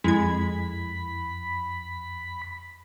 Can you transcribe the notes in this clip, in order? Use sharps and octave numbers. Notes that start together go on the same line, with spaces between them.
F2 G#3 E4 B5 G#6